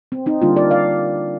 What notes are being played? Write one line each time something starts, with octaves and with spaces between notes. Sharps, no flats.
C4
C4 D#4
D3 G3 A#3 D4 F4
A#4 D5
D5 F5